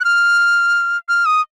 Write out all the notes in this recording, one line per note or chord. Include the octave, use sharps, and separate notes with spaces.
F#6
F6
F6
D#6